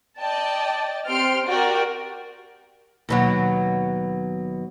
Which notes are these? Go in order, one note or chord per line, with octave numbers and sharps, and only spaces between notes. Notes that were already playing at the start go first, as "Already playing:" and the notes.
D5 D#5 G5 A5
C4 G4 C6 F6 D7
F#4 G4 A#4 D5 G5
D#2 B2 F#3